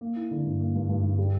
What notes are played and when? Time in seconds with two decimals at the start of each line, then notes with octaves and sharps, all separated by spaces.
0.01 A#3
0.16 E4
0.31 D3
0.44 G2
0.60 A#3
0.75 G2
0.89 G2
1.03 G2
1.19 G3